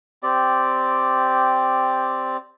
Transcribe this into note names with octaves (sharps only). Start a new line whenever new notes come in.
C4 G4 D5